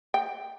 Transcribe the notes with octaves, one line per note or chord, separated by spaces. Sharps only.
G5